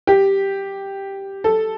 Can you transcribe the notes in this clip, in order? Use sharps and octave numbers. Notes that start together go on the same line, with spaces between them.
G4
A4